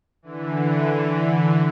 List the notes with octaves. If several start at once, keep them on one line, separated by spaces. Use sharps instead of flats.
D3 E3